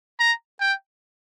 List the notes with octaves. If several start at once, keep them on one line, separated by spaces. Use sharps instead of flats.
A#5
G5